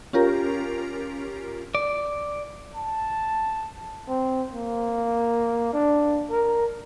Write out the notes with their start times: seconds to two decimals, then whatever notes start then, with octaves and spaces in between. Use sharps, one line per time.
0.13 C#4 F4 G4 A#4 A#5
1.75 D5
2.75 A5
4.08 C4
4.52 A#3
5.73 D4
6.30 A#4